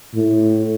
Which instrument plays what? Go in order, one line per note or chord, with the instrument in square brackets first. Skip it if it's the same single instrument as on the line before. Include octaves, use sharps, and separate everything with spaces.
[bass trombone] A2